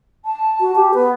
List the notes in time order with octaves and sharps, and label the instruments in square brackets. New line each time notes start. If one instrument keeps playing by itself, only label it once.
[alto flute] A5
[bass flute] F#4
G4
[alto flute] B3 [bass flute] B4